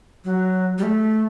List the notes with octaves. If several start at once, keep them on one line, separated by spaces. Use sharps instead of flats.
F#3
G3
A3